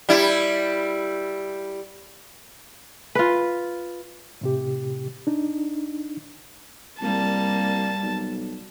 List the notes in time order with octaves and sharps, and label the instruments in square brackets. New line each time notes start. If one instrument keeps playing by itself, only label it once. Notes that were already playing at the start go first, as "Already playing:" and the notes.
[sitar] G3 E4
[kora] F4 B4
[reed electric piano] A2 C3 G4
D4 D#4
[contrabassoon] C2 [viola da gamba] G3 A#3 [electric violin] A5
[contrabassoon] B1